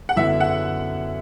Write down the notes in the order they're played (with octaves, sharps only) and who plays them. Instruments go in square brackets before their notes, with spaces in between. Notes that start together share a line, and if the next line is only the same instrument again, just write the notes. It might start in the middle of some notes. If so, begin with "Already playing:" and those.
[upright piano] F#5
[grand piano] F#2 D3 B3 E4 [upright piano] E5
[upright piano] F#5